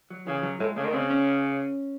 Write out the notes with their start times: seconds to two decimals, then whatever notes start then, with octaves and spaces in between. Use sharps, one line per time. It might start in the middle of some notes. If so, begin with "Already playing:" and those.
0.10 F#3
0.27 C#3 E3
0.43 F#3
0.60 A2 G#3
0.76 C#3 A3
0.85 D#3
0.93 C#3 C4
1.10 C#4